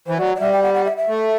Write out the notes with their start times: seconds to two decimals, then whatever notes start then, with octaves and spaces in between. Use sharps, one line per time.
0.07 E3 C5
0.18 F#3 D5
0.35 D5
0.40 G3 E5
0.52 G5
0.63 F#5
0.74 F#5
0.85 E5
0.97 E5
1.08 A3